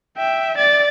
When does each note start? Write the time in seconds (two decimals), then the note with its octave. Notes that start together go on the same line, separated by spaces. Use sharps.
0.18 E5 G5
0.58 D5 A6